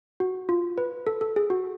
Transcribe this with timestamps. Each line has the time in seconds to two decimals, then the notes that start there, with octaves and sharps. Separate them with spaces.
0.20 F#4
0.49 F4
0.78 B4
1.07 A4
1.21 A4
1.36 G#4
1.50 F#4